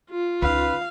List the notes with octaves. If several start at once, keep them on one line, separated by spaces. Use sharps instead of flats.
F4
C#2 D#4 B4 F5